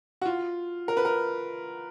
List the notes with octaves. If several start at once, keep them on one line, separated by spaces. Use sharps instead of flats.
F#4
F4
A#4
B4
A#4